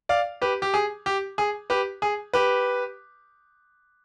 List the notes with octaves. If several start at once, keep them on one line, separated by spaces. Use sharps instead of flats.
D5 F5
G4 B4
G4
G#4
G4
G#4
G4 B4
G#4
G4 B4